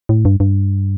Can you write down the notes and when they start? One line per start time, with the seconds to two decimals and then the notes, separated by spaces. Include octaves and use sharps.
0.09 A2
0.25 G2
0.40 G2